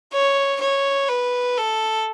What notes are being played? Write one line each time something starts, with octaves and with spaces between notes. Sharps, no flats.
C#5
C#5
B4
A4